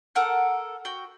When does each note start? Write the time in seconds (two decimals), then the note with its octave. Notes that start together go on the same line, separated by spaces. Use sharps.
0.15 A4 A#4 F#5 F#6
0.85 F#4 G5